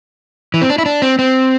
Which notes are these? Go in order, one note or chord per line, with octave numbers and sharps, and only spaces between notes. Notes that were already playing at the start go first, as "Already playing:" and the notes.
E3
C4
D4
E4
D4
C4
C4